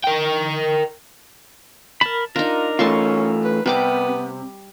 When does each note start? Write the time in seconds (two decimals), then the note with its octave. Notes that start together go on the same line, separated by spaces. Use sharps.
0.04 A#4 G5
2.01 A#4 A5 B5
2.36 D4 D#4 F4 A#4
2.79 E3 A3 C#4 F4 A5 C6 C#6
3.44 B4
3.66 C3 G3 B3 G4 D6